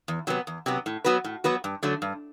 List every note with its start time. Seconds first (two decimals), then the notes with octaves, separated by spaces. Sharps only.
0.08 E2
0.27 C3 F#3 B3
0.47 E2
0.66 C3 F#3 B3
0.86 A2
1.05 F#3 B3 F#4 B4
1.24 A2
1.44 F#3 B3 F#4 B4
1.64 G2
1.83 D3 F#3 A3
2.02 G2